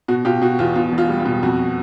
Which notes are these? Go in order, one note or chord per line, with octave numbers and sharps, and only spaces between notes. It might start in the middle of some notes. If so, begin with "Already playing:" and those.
B2 F#4
B2 F4 G4
B2 F#4
E2 F4
B2 F4
E1
F4
G3
F4
B2
F2 F#4